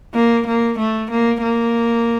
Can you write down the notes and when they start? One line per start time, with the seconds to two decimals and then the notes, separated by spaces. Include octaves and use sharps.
0.15 A#3
0.47 A#3
0.79 A3
1.11 A#3
1.42 A#3